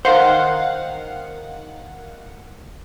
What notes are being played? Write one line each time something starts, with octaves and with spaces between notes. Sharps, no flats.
D#3 C5 F5 F#5